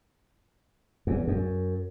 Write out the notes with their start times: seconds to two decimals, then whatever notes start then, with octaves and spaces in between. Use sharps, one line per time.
1.07 E2
1.27 F#2